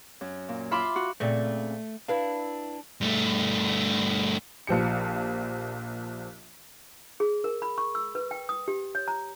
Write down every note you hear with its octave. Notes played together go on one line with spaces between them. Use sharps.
F#2
A#2
F4 E5 B5 C6 D6
F#4
A#2 C#3 A3 C4
D4 E4 B4 F5
G2 A3
A#1 F3 G4 C#7
G#4
A#4
B5
C#6
E6
B4
G5
D#6
G4
C#5
A#5